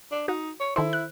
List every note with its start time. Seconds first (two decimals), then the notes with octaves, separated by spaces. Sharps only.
0.12 D4
0.28 D#4 F#4
0.60 C#5
0.76 D#3 E4 A4 C5
0.93 F#6